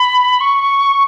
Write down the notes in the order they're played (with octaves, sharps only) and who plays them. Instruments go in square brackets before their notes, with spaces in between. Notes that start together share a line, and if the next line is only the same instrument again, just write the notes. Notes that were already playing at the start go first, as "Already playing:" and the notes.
Already playing: [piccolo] B5
C#6